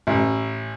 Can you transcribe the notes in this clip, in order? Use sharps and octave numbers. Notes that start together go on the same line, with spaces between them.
A1